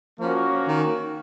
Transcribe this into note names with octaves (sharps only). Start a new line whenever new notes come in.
F3 A#3 C#4 F#4
D#3